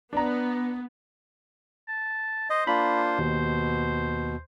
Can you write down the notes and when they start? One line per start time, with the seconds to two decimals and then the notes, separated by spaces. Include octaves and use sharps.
0.13 B3 D4 A#5
1.88 A5
2.50 C5 D#5
2.67 A#3 D4 F4 B5
3.19 D#2 B2